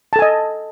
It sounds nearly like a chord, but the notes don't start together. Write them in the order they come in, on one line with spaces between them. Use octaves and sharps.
A5 A4 G#5 D#5